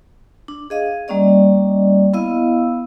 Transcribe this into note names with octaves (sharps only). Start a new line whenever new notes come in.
D4
G#4 D#5 F5
G3 A#3 C#4 D5 D#5
B3 E4 D#5 F5 E6